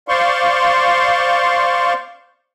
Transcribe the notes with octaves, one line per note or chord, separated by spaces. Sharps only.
C5 D5 F5 C6 C#6